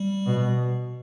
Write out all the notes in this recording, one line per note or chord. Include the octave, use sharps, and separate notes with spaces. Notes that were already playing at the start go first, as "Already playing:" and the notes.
Already playing: G3
B2